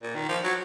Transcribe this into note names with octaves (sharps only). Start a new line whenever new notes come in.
A#2
D#3
F3
F#3